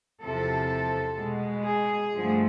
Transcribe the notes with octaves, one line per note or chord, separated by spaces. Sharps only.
E2 C3 F3 A4
B2 G#3
G#4
G2 D3 F3 A3